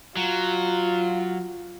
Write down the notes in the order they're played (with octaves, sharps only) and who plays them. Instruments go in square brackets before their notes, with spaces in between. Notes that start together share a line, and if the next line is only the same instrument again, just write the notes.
[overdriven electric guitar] F#3 [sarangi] F4